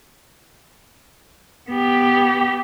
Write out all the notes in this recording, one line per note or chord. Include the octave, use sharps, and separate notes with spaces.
B3 G4